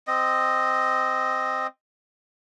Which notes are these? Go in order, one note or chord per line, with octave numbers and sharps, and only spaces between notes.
C4 D#5